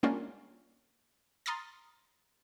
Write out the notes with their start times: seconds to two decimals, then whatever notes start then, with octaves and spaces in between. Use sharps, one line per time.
0.03 G3 G#3 A#3 C#4 D4 F4
1.46 A#5 C6 D#6 F6 A6